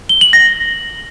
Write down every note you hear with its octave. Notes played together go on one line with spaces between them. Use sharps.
G7
F#7
A#6